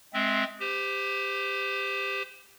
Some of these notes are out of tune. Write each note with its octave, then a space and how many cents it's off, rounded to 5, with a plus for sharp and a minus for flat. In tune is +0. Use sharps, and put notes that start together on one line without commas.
G#3 +20 C4 +0 E5 +0
G4 +15 C5 -30